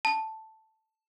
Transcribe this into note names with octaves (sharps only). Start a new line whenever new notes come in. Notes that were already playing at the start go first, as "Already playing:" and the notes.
A5